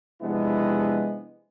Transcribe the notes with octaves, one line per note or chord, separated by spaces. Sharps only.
C3 F3 G#3 B3 D4 E4